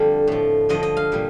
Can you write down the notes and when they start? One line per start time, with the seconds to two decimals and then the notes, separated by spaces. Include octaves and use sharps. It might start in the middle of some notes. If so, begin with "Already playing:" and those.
Already playing: F2 D3 G3 F5
0.27 A2 F3
0.69 G2 D3 F3 D#5
0.83 D#5
0.97 F5
1.12 A#2 G3